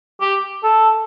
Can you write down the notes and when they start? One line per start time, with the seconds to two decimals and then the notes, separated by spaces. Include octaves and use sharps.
0.21 G4
0.64 A4